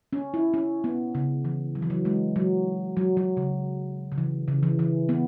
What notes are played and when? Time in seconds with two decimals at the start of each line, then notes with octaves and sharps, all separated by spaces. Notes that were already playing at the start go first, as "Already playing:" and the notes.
0.13 C#4
0.34 E4
0.54 C#4
0.84 B3
1.15 C#3
1.45 E3
1.75 F#3
1.82 E3
1.90 F#3
2.05 G#3
2.36 F#3
2.97 F#3
3.17 F#3
3.37 C#3
4.12 C#3
4.18 E3
4.48 C#3
4.63 E3
4.79 E3
5.09 B3